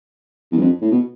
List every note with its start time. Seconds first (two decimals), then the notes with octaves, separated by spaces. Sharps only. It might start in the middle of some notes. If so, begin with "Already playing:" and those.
0.52 E2
0.57 G2
0.61 F2
0.81 A2
0.91 B2